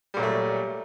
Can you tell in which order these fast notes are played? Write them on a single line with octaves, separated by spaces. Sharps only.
G3 A#2 F#3 A3